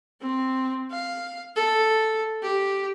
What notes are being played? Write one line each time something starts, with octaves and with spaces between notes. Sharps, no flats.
C4
F5
A4
G4